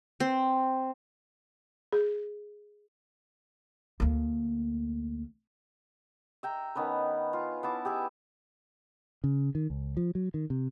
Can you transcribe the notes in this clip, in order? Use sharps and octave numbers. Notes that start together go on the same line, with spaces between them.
C4
G#4
D2 A#3
E5 G5 A#5
D#3 B3 C#4 B4
F4
B3 E4 A5 D6
G4 G#4 E5
C#3
D#3
C#2
F3
F#3
D#3
C3